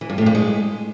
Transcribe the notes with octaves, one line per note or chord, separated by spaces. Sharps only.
E3
G2
A2
G2
G#3